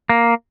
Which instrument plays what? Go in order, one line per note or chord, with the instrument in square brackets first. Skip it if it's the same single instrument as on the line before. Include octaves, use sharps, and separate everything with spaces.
[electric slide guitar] A#3